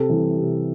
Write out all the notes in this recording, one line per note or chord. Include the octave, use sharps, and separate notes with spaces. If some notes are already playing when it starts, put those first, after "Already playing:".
Already playing: C3 A4
E3 G3
C3